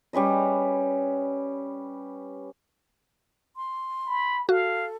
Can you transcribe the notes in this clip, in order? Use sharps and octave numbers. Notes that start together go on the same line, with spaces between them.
G3 C#4 B4 D#5
C6
B5
F#4 A4 F5